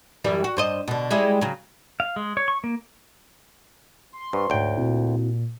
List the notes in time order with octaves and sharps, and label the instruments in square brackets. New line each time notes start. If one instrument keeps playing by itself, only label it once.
[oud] F#2 E3 G3
F#4
G2 C5 D#5
B2 D3
G3 G#3 E4
C#3 F#3
[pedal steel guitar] F5
G#3
C#5
C#6
A#3
[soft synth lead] C6
[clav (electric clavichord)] G2 [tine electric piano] B4 C5 C#6
[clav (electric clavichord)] D2 G5 [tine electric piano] G#2 C#5
[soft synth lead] A#2 [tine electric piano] C4 E4 F#4